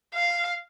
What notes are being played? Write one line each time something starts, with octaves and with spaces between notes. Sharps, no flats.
F5